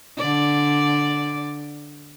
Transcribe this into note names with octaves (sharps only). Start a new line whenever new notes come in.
D3 D5